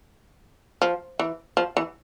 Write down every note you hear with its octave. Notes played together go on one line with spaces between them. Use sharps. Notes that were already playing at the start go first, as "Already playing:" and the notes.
F3
E3
F3
E3